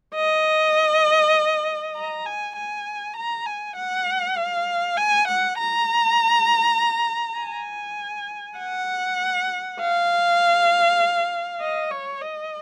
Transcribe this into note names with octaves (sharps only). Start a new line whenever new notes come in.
D#5
A#5
G#5
G#5
A#5
G#5
F#5
F5
G#5
F#5
A#5
G#5
F#5
F5
D#5
C#5
D#5